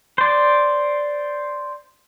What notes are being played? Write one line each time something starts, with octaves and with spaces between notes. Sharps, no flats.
C5 D5